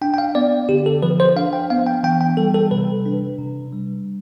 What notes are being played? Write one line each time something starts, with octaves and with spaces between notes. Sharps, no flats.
D4 G5
G5
F5
B3 D5
D3 G4
A4
F3 B4
C5
D4 F5
G5
B3 F5
G5
E3 G5
G5
G3 A4
A4
C3 B4
D4
C3
G3